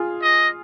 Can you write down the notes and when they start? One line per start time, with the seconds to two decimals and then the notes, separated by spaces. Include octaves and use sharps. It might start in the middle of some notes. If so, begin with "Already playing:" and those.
Already playing: F4 G#4
0.22 D#5